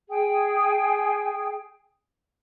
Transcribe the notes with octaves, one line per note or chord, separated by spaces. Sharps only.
G#4 G5